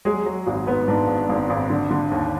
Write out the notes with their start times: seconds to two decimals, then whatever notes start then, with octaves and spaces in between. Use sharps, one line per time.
0.05 F#3 G#3 G#4
0.26 F#3
0.46 G#1 F#4
0.67 G#2 B3 B4
0.88 G#2 D4 D5
1.08 G#1
1.29 G#1
1.50 G#1
1.70 D3
1.91 D3
2.11 D#2